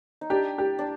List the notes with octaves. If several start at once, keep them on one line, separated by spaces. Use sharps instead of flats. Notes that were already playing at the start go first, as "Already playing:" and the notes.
D#4
D4 G4
G4
D4